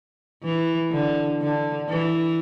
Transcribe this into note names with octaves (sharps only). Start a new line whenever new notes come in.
E3
D3
D3
E3